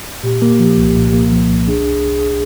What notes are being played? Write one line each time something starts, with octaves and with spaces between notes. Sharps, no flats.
A#2 G4
A#3
F3
C2
A#2
A#3
F3
C2
D4 G#4